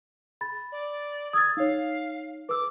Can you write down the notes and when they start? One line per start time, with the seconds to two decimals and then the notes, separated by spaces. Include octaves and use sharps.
0.41 B5 A6
0.72 D5
1.33 D#6 E6 G#6 A6
1.57 D#4 C#5 F5
2.49 B4 D6 E6